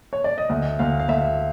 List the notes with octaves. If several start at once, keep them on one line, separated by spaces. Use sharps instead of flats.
C#5
D5
D#5
D2 E5
D2 F5
F5
D2 E5